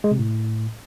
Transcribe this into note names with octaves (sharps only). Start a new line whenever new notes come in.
G#3
C3
A2